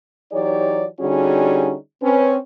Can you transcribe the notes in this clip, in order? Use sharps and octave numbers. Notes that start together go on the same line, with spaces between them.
E3 F#3 D#4 G4 C#5 D5
D3 G3 C#4 D#4 F#4 G#4
C4 C#4 B4